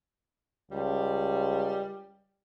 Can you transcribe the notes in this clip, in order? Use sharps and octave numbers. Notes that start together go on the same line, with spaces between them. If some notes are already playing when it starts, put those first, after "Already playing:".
C#2 G3